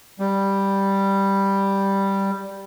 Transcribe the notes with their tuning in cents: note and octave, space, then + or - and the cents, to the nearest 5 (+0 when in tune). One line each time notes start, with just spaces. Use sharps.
G3 +0